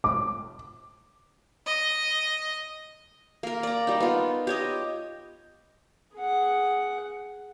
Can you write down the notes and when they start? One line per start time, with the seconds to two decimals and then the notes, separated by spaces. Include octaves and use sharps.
0.04 D6
1.66 D#5
3.43 A#3 A#4
3.63 D5 A#5
3.87 G3 D#4
4.00 B3 F4
4.47 G4 C#5 D#5
6.16 G#4 F#5